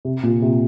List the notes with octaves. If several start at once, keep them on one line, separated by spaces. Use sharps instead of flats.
C3
A#2
C3